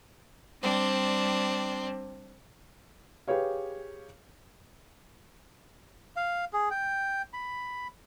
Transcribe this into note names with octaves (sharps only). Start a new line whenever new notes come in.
G3 C4 D4
G4 G#4 B4 C#5 F5
F5
G#4
G5
B5